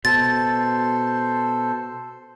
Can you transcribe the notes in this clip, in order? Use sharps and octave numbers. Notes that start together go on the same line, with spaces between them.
B2 A4 C5 A6